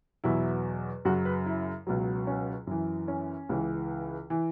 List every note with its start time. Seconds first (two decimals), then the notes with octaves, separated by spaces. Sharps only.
0.24 E2 B2 F#3 E4
1.05 F#2 C#3 F#3 F#4
1.25 B4
1.46 E4
1.87 C#2 B2 F#3
2.27 C#4
2.67 F#2 E3
3.08 C#4
3.49 C#2 C#3 E3
4.30 E3